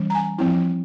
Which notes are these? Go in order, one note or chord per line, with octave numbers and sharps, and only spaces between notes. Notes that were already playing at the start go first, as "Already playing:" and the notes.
Already playing: E3 G3 C#4
A#5
G#5
F3 C4 E4